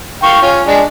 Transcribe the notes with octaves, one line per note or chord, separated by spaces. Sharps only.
F5 G5 C#6
C#4 F4
G#3 D4